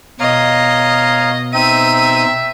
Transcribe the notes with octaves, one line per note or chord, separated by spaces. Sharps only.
B2 C#5 D#5 F5 A#5
C4 D#4 E5 D#7